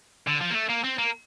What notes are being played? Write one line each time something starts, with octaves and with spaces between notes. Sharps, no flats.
D3
F3
A#3
A3
A#3
C4
A#3